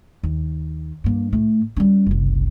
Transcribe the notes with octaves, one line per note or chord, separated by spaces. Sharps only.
D#2
G2 A#3
A2 A3
G3 C#4
F#1 C2